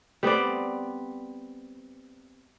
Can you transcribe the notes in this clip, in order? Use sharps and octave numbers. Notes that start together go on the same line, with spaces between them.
G3 B3 C4 D5